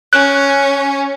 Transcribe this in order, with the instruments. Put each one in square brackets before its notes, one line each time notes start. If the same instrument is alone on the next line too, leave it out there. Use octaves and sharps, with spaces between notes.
[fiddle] C#4 [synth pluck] F#6